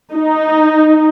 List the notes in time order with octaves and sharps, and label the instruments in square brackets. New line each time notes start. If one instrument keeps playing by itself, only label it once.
[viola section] D#4